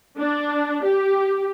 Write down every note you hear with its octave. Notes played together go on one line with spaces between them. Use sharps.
D4
G4